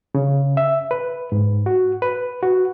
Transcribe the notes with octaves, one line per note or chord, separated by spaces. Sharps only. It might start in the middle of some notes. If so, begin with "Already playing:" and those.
C#3
E5
B4
G#2
F#4
B4
F#4